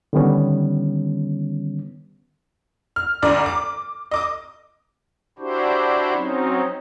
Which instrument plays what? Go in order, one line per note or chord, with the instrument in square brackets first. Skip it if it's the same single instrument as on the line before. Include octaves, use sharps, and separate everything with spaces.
[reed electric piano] D3 D#3 G3 B3 C#4
[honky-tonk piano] F6
D2 G2 D5 A#5
D6
D#5 D6 D#6
[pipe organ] D4 E4 F#4 G4 C5
F#3 C4 C#4 D#4